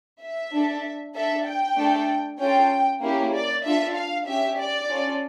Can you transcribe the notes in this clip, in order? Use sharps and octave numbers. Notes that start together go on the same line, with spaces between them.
E5
D4 A4
D4 A4 E5
G5
A3 D4 A4
C#4 F4 A4 G5
A#3 C#4 E4 G4
D5
D4 F4 A4 E5
F5
C#4 G4 E5
D5
C#4 F4 A4